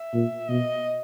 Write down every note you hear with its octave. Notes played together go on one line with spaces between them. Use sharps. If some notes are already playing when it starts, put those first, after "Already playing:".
Already playing: E5
A#2
B2 D#5